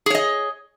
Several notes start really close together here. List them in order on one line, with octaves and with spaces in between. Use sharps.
G#4 C#5 D#5